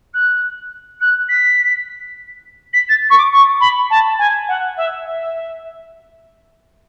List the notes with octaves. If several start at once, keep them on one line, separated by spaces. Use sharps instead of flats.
F#6
F#6
B6
B6
A6
C#6
D6
C#6
B5
A5
G#5
F#5
E5
E5